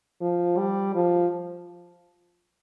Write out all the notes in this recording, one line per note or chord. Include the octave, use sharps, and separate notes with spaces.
F3
G3
F3